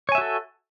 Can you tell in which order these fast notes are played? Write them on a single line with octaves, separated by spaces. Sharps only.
C#5 G#5 E5 F#4 A4